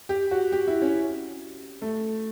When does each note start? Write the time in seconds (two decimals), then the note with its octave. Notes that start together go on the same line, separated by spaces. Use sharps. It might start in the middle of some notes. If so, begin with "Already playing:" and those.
0.09 G4
0.31 F#4
0.52 G4
0.67 E4
0.82 C#4
1.82 A3